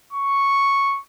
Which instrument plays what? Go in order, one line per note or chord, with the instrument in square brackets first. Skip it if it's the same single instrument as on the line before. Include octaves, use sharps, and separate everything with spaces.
[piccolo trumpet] C#6